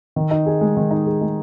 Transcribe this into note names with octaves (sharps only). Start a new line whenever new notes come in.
D#3
D#4
G#4
G#3
D#3
D#4
G#4
G#3